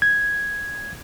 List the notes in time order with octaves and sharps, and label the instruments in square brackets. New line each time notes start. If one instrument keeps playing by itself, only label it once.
[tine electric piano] G#6